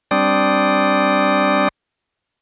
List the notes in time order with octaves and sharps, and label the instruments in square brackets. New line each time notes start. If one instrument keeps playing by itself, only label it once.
[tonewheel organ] G3 C4 D4 D5 D#6